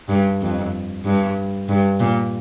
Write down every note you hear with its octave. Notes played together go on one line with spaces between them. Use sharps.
G2
F2
G2
G2
A#2